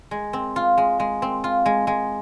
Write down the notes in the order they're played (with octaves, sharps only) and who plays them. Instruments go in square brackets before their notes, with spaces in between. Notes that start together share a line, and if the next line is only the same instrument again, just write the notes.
[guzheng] G#3
C4
F4
G#3
G#3
C4
F4
G#3
G#3